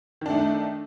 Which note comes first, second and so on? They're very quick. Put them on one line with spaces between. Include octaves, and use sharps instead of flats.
D#3 D4 A3 D#4